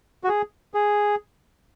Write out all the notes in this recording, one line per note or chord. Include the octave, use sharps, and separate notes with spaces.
F#4
G#4
G#4